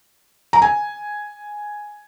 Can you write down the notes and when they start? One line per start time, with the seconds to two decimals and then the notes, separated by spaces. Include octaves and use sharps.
0.53 A#5
0.62 G#5